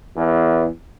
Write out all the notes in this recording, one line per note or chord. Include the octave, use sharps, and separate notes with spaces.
E2